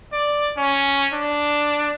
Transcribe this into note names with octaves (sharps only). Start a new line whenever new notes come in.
D5
C#4
D4